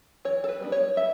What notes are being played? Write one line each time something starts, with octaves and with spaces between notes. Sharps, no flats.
E3 C#5
A4
B4
G3 B3 D4
C#5
G3 E5